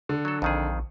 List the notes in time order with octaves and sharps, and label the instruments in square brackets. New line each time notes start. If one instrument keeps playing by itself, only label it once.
[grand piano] D3
[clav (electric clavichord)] F#3 A4
[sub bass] A#1 [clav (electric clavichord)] F2 D#3 G#4